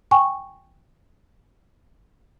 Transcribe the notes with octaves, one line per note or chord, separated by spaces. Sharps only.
G5 G#5 C#6